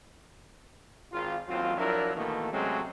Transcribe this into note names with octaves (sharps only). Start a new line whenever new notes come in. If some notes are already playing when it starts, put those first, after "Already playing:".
G#1 F4
A1 D#2 F#3 C4 F4
F3 F#3 D4 E4 F4 A#4
B2 D#3 E3 A3 A#3
C3 F#3 G#3 A3 C4 C#4